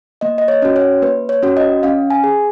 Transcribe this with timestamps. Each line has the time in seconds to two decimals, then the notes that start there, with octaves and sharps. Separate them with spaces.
0.21 A#3 D#5
0.38 D#5
0.48 C#5
0.62 C#4 F#4
0.76 C#5
1.02 A#3 B4
1.29 C#5
1.43 C#4 F#4
1.57 D#5
1.83 C#4 F5
2.10 G#5
2.24 G#4